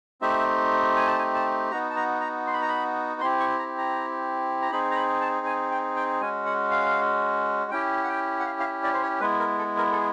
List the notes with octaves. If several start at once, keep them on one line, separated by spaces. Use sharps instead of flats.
A3 C4 D#4 G4 E5
G#5
A5
G#5
A5
B3 D#4 F#4 A#5
A5
A#5
A#5
C6
B5
A#5
B5
C4 E4 G4 C6
C#6
A#5
A#5
A#5
C4 D#4 G#4 B5
A#5
B5
A5
G#5
G5
G5
G#3 C#4 F#4 G#5
F#5
F5
C#4 E4 G4 G5
F#5
G5
F#5
F5
F5
E5
D5
C5
C#5
G#3 B3 E4 B4
A#4
A4
A#4
A4
G#4